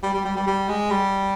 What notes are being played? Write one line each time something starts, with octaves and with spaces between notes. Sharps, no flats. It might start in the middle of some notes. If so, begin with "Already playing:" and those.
G3
G3
G3
G3
G3
G#3
G3